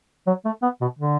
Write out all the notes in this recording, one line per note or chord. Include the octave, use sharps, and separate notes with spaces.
F#3
A3
B3
B2
D3